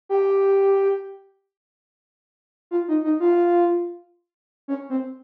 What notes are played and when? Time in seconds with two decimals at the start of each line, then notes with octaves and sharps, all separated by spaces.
0.09 G4
2.71 F4
2.88 D#4
3.04 D#4
3.20 F4
4.68 C#4
4.90 C4